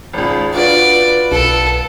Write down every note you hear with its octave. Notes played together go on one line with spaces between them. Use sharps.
G#1 C#2
D4 F4 F#4 B4 D5
B1 A4